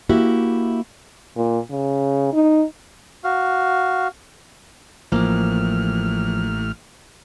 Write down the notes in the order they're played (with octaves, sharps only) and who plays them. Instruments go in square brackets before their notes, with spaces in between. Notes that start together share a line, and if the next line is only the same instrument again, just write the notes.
[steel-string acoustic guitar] A#3 E4 F#4 G4 E5
[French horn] A#2
C#3
D#4
[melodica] F#4 F5
[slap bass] A1 [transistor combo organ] A2 F6 [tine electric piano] F3 [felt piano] A#3